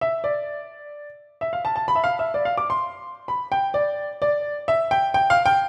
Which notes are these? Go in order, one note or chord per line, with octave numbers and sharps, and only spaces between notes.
E5
D5
E5
F5
A5
A5
B5
E5
F5
E5
D5
F5
D6
C6
B5
G5
D5
D5
E5
G5
G5
F5
G5